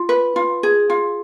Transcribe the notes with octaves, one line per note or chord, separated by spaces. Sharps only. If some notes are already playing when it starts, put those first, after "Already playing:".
Already playing: F4
B4
F4
G#4
F4